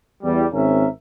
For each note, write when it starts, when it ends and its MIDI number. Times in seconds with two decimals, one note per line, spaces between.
0.23 0.44 40
0.23 0.44 55
0.53 0.87 32
0.53 0.87 60
0.53 0.87 61
0.53 0.87 70
0.53 0.87 76